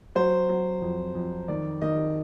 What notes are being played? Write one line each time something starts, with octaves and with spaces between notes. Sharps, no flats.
F#3 C5
F#3
F2
F2
D#3 D5
D#3 D#5